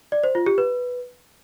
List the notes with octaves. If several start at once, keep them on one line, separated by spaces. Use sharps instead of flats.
D5
C5
F4
G4
B4